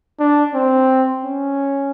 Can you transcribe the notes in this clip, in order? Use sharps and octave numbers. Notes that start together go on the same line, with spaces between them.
D4
C4
C#4